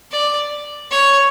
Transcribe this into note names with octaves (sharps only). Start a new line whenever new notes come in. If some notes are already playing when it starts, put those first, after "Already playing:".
D5
C#5